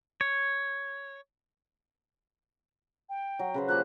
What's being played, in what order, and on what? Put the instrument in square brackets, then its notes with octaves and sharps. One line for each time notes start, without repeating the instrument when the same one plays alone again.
[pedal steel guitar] C#5
[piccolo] G5
[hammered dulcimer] F#3
C#3 B4 C5
[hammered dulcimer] F3 A#3 G4 [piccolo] F#6